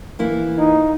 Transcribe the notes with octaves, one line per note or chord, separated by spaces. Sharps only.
E3 A#3 E4
D#4